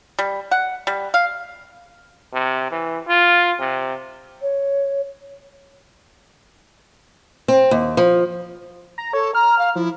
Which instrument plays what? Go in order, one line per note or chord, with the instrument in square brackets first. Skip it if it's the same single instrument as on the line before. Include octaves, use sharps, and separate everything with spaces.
[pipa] G3
F#5
G3
F5
[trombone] C3
E3
F4
C3
[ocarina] C#5
[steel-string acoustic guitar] C4
D#2
F3
[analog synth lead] A#5
[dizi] A4 [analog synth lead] C#5
[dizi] A#5 [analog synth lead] F6
[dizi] F5
[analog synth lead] F3 [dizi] E4